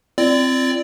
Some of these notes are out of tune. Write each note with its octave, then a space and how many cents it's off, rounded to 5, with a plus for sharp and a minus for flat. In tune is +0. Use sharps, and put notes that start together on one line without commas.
C4 +0 F4 -45 D5 +0